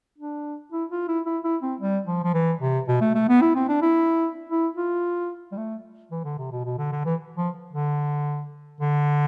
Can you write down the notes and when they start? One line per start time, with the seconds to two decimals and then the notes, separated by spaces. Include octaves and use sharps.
0.18 D4
0.72 E4
0.91 F4
1.08 E4
1.26 E4
1.44 E4
1.63 C4
1.80 G3
2.07 F3
2.24 F3
2.34 E3
2.61 C3
2.88 B2
3.01 A3
3.15 A3
3.29 B3
3.41 E4
3.55 C4
3.69 D4
3.82 E4
4.49 E4
4.77 F4
5.52 G3
5.57 A3
6.11 E3
6.24 D3
6.38 C3
6.52 B2
6.65 B2
6.78 D3
6.92 D3
7.05 E3
7.37 F3
7.73 D3
8.81 D3